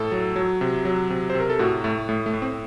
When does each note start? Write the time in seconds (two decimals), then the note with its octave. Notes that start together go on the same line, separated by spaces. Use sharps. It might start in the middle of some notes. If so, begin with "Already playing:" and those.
Already playing: A2 A4
0.12 F#3
0.36 F#3
0.61 C3
0.85 F#3
1.10 C3
1.30 C5
1.35 C3 A#4
1.50 A4
1.59 A2 F#4
1.84 A2 A3
2.09 A2 A3
2.26 A3
2.34 A2
2.42 C4